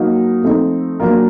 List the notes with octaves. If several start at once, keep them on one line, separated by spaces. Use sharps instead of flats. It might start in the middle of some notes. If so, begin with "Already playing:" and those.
Already playing: F#3 A#3 D#4 F#4
F3 A3 C4 D#4
F#3 A#3 D4 F4 A#4